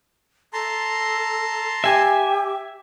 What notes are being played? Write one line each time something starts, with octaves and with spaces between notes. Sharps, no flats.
A4 A5 A#5 C6
G4 E5 G#5